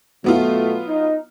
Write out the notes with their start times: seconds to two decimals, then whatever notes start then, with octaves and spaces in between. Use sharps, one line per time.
0.24 B2 F#3 A3 B3 F4
0.87 D#4